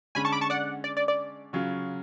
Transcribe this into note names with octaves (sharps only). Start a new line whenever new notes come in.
D3 G#3 C#4 G#5 B5
A5 C#6
B5 D6
A5 C#6
D5 F#5
D5
D5
D5
C#3 F#3 C#4 F4